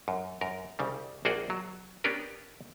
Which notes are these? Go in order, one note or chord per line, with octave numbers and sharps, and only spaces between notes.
F#2
F#2 A#4
C2 C#3 G3
A#1 A#3 F#4 G#4 D5 G5
F#3
B3 C#4 D4 G4 A#4 B4